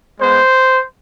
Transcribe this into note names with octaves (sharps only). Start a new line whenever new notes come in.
G#3 B3 C5